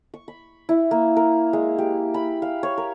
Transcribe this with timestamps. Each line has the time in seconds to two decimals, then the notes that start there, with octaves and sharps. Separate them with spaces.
0.14 C#6
0.28 B5
0.69 E4
0.91 A#3
1.17 A#4
1.53 G#3
1.79 G4
2.14 B5
2.42 F5
2.63 C#5
2.78 A#4